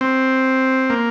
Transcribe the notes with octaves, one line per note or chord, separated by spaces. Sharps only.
C4
A#3